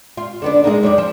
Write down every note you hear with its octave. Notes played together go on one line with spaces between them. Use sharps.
F4
D3 B3 D4
G#3 A#3 D#4
F2 C#5 D5
F3